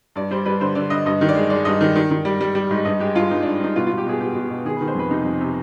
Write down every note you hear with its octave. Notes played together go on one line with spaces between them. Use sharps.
G2 D5
G3 C5
G3 B4
D3 C5
D3 D5
D3 D#5
G2 D#5
D#3
D5
G#3
G#3 D5
G2 D#5
D#3
D#3
D#3
G3
G3
G3
G#2
G2 D#5
G#3 G4
G2 F4
G2 D#4
G2 D4
G2 D#4
B2 F4
B2 F4
G4
B2 G#4
B2 G4
B2
B2
D#3 G#4
D#3 B4
C5
F2 B4
C3 D#4
F2
C3